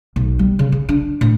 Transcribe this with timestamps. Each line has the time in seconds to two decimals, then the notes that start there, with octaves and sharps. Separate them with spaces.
0.16 B1
0.39 G3
0.59 C#3
0.72 C#3
0.89 D4
1.21 A2